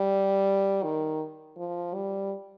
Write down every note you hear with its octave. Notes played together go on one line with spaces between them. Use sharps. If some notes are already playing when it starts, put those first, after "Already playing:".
Already playing: G3
D#3
F3
G3